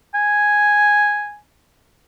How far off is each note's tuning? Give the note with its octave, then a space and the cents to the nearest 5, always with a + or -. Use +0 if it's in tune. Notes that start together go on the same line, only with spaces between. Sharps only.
G#5 +0